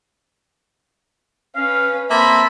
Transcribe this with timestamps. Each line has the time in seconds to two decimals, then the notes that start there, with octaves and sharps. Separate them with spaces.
1.55 C#4 B4 F5
2.10 A#3 C4 E5 A5 B5